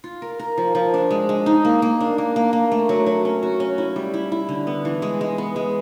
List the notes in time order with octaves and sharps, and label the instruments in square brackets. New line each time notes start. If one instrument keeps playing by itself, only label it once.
[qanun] F4
A#4
A#4
F3
F3
D4
G#3
G#3
D#4
A#3
A#3
D4
A#3
A#3
A#3
A3
F#3
F#3
C#4
F#4
C#4
E4
G3
E4
E4
D3
B3
E3
G#3
G#3
B3
G#3